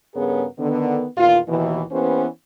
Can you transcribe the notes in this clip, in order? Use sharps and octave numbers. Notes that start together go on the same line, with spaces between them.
G2 C#3 B3 G#4 A#4 C#5
D3 D#3 B3
E2 A#2 D#3 F4
D#2 B2 D#3 E3
E3 A#3 B3 C#4 G4 C5